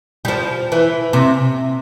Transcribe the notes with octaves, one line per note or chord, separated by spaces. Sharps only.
G3
F3
E3
C3